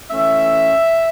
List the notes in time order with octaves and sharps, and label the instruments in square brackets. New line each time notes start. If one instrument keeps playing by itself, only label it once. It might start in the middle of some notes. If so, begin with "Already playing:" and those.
[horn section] E3 A3 C#4 E5